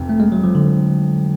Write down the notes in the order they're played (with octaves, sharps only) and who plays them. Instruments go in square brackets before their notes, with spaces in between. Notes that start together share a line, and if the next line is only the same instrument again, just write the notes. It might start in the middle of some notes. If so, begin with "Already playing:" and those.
Already playing: [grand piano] F1 F2
[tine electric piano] A3
G#3
F#3
F3
D3